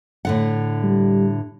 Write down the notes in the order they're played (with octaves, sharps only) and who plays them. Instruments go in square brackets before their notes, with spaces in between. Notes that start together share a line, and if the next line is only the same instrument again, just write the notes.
[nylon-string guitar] A2 D3 F#5
[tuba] G3